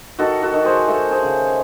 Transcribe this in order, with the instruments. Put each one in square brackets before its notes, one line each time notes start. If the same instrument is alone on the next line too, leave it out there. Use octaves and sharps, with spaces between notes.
[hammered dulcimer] D#3 F#4 A4
F#4 A4
D#3
G#4 C5
A3 F#4 A4
G#4 C5
C#3